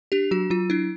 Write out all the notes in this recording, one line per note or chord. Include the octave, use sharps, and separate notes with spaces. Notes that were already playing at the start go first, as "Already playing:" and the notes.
D4 G4
F#3 F#4
F#3 F4
D4 E4